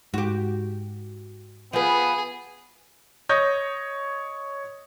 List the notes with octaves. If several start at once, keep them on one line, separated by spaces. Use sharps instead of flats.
G#2 F#4 G4
F3 B3 G#4 B4
C#5 D#5 D#6 G6 A#6